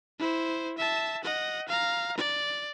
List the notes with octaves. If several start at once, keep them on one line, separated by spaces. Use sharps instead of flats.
E4 C5
E5 A5
D#5 F#5
F5 A#5
D5